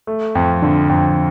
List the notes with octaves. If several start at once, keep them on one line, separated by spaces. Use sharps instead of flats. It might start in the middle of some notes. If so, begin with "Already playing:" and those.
A3
F2
D3
F2